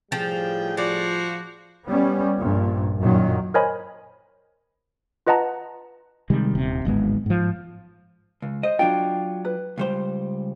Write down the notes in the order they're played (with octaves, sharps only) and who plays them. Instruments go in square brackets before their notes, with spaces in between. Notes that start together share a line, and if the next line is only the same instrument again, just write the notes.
[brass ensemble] A2 G3 G#4 [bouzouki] F3 [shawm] G5
[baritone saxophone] F3 [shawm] F#4 [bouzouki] D5
[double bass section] G3 B3 C#4
A#1 G2 A#2
F#2 A#2 D#3 F#3
[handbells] A#4 C5 C#5 D#5 G#5 B5
F4 B4 D#5 F#5 A5 A#5
[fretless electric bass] C3 D#3 G3 G#3
D#1 C3
D1 G#1 G#3 B3
G#2 F3
[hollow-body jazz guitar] C#2
[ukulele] C5 [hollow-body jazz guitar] D#5
[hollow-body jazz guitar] F#3 D4 F4 [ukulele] G5
[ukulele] B4
[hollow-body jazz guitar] C#2 G3 C5